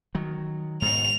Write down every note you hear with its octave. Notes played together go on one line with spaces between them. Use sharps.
D#3 F#3
G#2 B2 F7